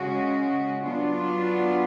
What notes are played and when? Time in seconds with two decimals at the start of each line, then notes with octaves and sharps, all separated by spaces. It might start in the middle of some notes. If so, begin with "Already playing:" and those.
Already playing: C#3 G#3 C#4 F#4
0.84 F#3 B3 D4 F4